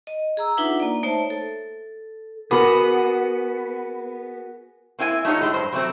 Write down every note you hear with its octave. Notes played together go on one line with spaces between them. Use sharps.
D#5
G#4 A#5 E6
D4 D#4 F4 B4 E5 F#5
A#3 D5
A3 D#4 C5 C#5 E5 A5
A4
B3 F#4 G#4 A#4 B4 F#5 B5 D6
A#3 C4 E4 F#4 G#5
A3 D4 D#4 F4 G4 C#5
A2 G#3
G2 C5
C3 F#3 A3 C4